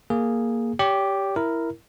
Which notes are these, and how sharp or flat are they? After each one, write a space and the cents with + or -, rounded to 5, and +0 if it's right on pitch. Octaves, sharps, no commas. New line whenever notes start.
A#3 +0 G#4 +0
G4 +0 C#5 +40
E4 +5 A#4 +0